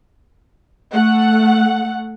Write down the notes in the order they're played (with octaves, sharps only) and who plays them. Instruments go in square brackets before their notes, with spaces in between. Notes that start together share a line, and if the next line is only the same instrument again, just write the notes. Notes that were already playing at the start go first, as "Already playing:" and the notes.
[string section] A3 F#5